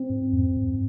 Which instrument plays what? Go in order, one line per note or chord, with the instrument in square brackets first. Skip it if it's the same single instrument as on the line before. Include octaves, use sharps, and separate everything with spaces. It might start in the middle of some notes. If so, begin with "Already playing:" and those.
Already playing: [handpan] C4
[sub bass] G#2
F2
G#2